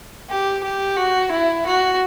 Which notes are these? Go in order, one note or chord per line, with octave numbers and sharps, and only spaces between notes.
G4
G4
F#4
E4
F#4